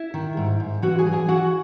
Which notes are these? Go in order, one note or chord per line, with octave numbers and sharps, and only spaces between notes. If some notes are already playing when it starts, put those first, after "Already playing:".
Already playing: E4 E5
D#3
G#2
G#2
E3 F#4 F#5
G#4 G#5
E3
G#4 G#5
E3 F#4 F#5